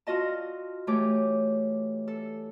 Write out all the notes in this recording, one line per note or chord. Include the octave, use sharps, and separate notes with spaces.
F4 F#4 D#5 A5
E3 A3 G4 C#5 D6
A4